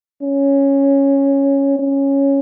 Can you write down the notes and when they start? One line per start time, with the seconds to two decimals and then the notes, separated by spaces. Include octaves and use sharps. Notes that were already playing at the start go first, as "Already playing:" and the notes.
0.22 C#4
1.79 C#4